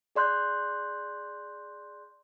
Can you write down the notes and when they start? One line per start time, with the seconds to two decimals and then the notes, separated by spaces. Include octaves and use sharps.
0.15 G#4 D5 C6 F#6 G6